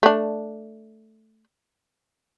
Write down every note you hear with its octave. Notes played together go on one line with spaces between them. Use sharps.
A3 D4